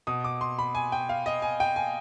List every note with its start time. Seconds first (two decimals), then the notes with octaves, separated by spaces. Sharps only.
0.07 B2 D#6
0.24 D6
0.41 C6
0.59 B5
0.75 G#5
0.92 G5
1.09 F5
1.26 D#5
1.42 G#5
1.60 G5
1.76 G#5